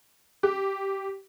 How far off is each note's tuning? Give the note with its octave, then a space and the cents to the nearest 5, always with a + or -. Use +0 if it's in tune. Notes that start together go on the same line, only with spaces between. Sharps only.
G4 -10